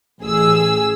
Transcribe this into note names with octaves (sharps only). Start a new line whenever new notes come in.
A1 G#4 E6